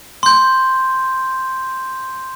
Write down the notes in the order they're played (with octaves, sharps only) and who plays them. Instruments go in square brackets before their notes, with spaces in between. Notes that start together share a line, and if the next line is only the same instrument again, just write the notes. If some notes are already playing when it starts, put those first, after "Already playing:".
[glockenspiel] C6 G6